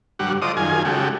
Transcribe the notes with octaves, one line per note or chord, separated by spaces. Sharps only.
G2 D3 F#3 G3 F#5
F4 A4 C5 D5 D#5 D#6
F#2 D#3 F4 G#4 G#5
C#3 G#3 F#4 G4 A4